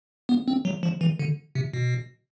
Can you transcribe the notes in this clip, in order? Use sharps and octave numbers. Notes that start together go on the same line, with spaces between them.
B3
C4
F#3
F3
E3
D3
C3
B2